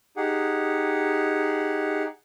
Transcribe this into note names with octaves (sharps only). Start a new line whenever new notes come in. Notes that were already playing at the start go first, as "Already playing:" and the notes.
D#4 G4 G#4 F#5